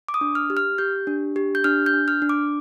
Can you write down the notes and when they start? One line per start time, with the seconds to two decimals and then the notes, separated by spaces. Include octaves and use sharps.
0.08 D6
0.14 D#6
0.21 D4
0.35 F6
0.50 G4
0.57 F6
0.78 G4 G6
1.07 D4
1.36 G4
1.55 G6
1.64 D4 F6
1.86 G6
1.93 D4
2.08 F6
2.22 D4
2.29 D6